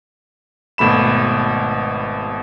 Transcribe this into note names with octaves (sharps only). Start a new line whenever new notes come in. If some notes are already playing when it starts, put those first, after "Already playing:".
G#1 B2 A3 B5 E7